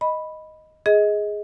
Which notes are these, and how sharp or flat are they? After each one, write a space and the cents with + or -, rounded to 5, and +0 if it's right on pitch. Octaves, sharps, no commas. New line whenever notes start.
D#5 +0 B5 +0
G#4 +0 D#5 +25